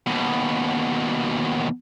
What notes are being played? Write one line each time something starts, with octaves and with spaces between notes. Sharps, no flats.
D#2 B2